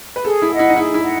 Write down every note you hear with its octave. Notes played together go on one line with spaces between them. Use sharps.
B4
G#4 A4
E4
D#5 F#5
E4
D#4
E4 G#4
E4
D#5 F#5